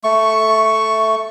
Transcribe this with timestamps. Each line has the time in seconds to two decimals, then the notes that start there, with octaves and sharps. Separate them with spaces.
0.04 A3 C#6